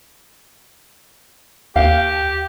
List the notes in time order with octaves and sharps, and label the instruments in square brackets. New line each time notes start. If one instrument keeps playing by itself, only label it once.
[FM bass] D#2 [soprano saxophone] G4 [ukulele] F5